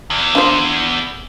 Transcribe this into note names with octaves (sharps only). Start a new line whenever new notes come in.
E2
D4 F4 C5